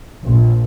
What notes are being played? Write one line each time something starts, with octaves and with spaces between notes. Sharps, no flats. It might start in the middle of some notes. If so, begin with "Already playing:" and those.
A#1